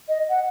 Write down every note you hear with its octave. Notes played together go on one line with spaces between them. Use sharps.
D#5
F#5